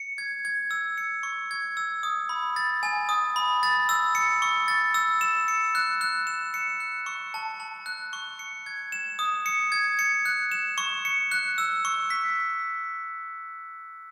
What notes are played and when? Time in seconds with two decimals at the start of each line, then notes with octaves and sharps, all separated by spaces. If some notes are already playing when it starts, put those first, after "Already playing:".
Already playing: C#7
0.18 G#6
0.45 G#6
0.71 E6
0.98 C#7
1.23 C#6
1.51 G#6
1.77 E6
2.03 D#6
2.29 B5
2.56 A6
2.83 G#5
3.09 D#6
3.36 B5
3.63 A6
3.89 E6
4.15 C#7
4.42 C#6
4.68 A6
4.94 E6
5.21 E7
5.48 C#7
5.75 F#6
6.01 F#6
6.27 E7
6.54 C#7
6.80 F#6
7.06 C#6
7.34 A5
7.60 A5
7.86 F#6
8.13 C#6
8.39 C#7
8.66 G#6
8.92 E7
9.19 D#6
9.46 C#7
9.72 G#6
9.99 C#7
10.25 F#6
10.52 E7
10.78 C#6
11.05 C#7
11.31 F#6
11.58 E6
11.85 C#6
12.10 B6